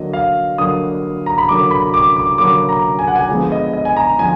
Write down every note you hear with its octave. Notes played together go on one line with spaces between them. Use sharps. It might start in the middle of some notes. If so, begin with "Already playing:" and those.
Already playing: D3 F#3 A#3 D#5
F5
D3 F#3 A#3 D#6
A#5
B5
D3 F#3 A#3 D6
B5
D6
D6
D3 F#3 A#3 D6
A#5
G#5
F#5
G#5
D3 F3 G#3 B3
D#5
D#5
G#5
A#5
D3 F3 G#5